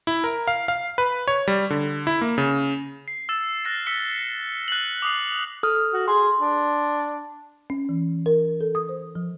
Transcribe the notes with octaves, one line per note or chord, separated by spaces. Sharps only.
E4
A#4
F5
F5
B4
C#5
G3
D3
E4
A#3
C#3
C7
E6 A6 E7
F6 F#6 A6 A#6 C7
E6 B6 C#7 G7
F#6 F#7
D6 D#6 C7
A4 D#6 F6
F#4
G#4 C6
D4
C#4
E3
A#4
A4
D#6
C5
F3